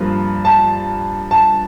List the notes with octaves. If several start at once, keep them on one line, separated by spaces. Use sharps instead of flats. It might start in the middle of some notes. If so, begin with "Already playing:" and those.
Already playing: G2 F3 A#3 F4
A5
A5